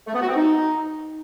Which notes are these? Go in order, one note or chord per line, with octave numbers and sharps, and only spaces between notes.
A3
B3
F#4
C4
D#4